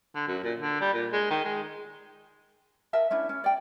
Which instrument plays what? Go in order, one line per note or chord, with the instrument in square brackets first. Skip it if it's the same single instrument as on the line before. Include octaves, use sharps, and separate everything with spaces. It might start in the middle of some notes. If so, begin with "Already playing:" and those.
[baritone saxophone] D3
F#2
A#2
D3
G3
A#2
G#3
D#3
G#3
[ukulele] A#4 D#5 E5 A5
C#4 D4 E4
C#4
D5 G5